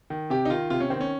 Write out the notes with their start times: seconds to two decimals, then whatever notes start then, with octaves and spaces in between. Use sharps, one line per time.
0.10 D#3
0.30 C3 G4
0.45 D#4
0.50 D#3 F4
0.70 C3 F4
0.80 C#4
0.90 D#3 C4
1.01 C#4